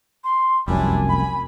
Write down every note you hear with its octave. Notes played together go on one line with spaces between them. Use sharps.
C6
F1 C2 F#2 G3 D4 E4 G#5
B5